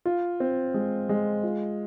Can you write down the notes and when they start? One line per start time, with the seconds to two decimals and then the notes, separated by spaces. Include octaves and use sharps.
0.05 F4
0.40 C4
0.74 G#3
1.09 G#3
1.43 F4